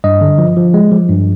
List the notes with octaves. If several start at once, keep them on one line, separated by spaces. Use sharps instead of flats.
G2 D#5
D3
F3
F3
G#3
F3
G2